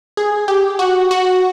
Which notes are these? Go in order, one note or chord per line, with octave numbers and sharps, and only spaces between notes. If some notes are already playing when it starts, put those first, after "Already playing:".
G#4
G4
F#4
F#4